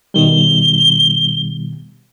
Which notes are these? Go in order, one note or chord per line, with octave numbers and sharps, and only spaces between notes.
B2 D#3 G3 G7